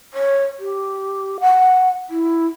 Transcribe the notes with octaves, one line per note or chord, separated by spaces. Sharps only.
C#5
G4
F#5
E4